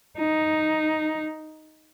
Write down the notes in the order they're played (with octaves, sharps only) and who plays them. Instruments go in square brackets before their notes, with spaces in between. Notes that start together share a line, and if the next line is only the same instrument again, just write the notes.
[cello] D#4